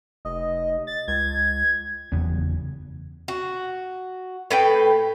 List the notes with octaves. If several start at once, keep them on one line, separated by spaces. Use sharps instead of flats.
F1 D#5
A6
C#2 G#6
F#1 E2 C#3 B3
F#4
A2 B4 G5